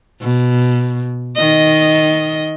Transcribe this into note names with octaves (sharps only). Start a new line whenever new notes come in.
B2
D#3 D#5